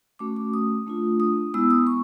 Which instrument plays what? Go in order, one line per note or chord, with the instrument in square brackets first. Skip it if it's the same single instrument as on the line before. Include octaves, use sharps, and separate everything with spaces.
[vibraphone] A3 C#4 F#4 D6
D6
D#6
A3 D4 F4
D#6
G#3 B3 E4 E6
D#6
C#6